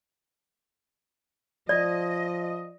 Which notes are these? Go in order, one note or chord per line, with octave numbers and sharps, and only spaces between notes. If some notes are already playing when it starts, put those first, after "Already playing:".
F3 D5 D#5